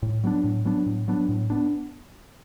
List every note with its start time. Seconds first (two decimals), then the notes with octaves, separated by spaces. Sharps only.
0.03 A2
0.24 F#3 B3 D4
0.44 A2
0.65 F#3 B3 D4
0.86 A2
1.08 F#3 B3 D4
1.29 A2
1.50 B3 D4